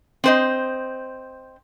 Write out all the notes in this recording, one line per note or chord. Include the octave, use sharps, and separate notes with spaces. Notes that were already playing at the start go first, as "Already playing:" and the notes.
C4 C5 D#5